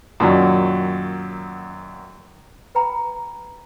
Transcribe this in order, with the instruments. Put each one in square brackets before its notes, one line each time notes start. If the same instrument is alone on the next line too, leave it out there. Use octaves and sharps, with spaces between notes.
[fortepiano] F#2 A#2 D#3 F#3
[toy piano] B4 G5 A#5 B5